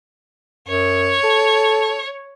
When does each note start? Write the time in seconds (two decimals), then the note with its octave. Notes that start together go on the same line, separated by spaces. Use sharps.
0.68 F#2 C#5
1.23 A4